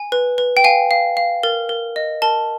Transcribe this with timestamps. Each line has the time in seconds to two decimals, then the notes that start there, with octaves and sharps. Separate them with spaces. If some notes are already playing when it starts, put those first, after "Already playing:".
Already playing: G#5
0.12 B4
0.38 B4
0.57 G5
0.64 F5 G#5
0.91 F5
1.17 F5
1.43 A#4
1.69 A#4
1.96 D#5
2.22 A#4 A5